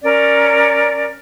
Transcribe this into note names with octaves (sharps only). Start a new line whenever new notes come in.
C#4 A#4 D5